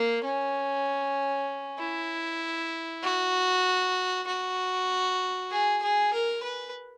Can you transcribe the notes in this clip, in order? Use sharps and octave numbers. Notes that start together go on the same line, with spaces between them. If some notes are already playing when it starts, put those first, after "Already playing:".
Already playing: A#3
C#4
E4
F#4
F#4
G#4
G#4
A#4
B4